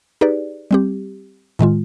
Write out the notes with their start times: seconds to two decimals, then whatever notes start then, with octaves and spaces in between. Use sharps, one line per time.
0.21 D#4 G4 G#4 B4 D5
0.71 G3 C4 G4
1.59 A2 D#3 G#3 F4